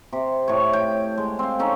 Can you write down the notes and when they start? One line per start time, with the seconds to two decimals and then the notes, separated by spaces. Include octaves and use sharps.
0.13 C3
0.48 A2 C#5
0.73 G5
1.18 G#3
1.39 C4 F5
1.59 C#4 D#4 A4